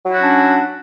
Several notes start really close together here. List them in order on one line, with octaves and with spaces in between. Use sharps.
F#3 E4 F#4 C#4 D4